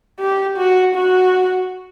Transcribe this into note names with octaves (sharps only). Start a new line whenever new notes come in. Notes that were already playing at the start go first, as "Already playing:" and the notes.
G4
F#4
F#4